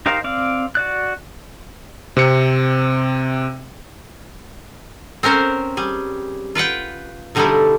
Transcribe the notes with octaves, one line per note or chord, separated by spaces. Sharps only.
D#4 G4 A#4 C5 F5
C4 D5 F5
F#4 D5 F#6
C3 C4 C#7
C4 C#4 A#4 C5 C#5
G3 G#4
F4 B4 F#5 G5
B2 D3 G3 A3 D#4 E4